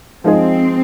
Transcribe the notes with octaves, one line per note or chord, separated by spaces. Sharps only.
F3 G#3 C4 D#4 G#4